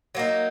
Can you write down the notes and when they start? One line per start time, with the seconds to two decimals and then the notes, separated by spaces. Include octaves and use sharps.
0.15 F#3 A#3 D#4